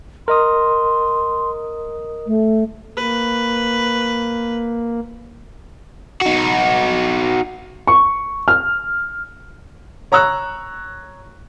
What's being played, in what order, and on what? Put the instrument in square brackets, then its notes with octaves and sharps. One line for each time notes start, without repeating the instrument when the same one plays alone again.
[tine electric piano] A#4 D#5 D#6 [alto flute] C6
[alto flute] A3
[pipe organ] A#3 [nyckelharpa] B4
[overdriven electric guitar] D#4 F#4
[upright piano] C#6
F6
C#5 A#5 C#6 E6 F#6